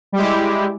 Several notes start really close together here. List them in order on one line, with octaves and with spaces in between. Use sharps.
G3 G4 G#3 E4